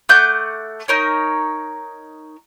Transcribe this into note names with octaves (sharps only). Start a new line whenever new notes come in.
A3 F#5 D6 G6
D#4 A#4 C#5